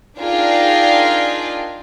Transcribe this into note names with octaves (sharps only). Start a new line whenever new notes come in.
D4 D#4 F4 G#4 A#4 G5